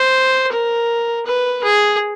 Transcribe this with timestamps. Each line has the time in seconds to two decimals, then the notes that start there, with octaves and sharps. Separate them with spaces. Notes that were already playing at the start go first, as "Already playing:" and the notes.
Already playing: C5
0.52 A#4
1.26 B4
1.63 G#4